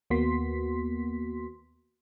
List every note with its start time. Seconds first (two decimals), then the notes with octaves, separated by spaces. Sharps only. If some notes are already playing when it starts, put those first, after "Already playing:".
0.10 D#2 A#3 B3 F#4 C6 B6